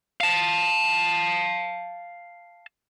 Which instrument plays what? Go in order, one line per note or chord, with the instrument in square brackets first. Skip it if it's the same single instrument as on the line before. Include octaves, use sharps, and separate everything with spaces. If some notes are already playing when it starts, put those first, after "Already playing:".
[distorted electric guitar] F5 A5